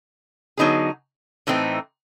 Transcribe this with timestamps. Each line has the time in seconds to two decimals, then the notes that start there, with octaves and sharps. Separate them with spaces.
0.57 D3 F#3 B3 D#4 G#4
1.47 A2 E3 A3 C4 D#4